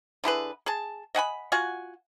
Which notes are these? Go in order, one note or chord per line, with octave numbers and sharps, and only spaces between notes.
D3 E4 G#4 B4
G#4 A5
D#5 F#5 G#5 B5
F4 F#4 F#5 G#5